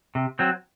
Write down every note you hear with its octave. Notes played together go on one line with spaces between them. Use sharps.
C3
F#3 C4